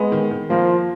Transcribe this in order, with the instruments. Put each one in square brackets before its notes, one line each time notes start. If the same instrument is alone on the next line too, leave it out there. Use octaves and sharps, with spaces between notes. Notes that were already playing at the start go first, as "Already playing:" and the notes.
Already playing: [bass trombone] G#3 [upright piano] B3
[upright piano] D#3
D#3
[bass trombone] F3 [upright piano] A#3
[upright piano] F4